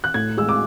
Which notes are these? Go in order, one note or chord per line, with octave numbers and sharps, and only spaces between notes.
F#6
A2 G#6
G#3 E6
D6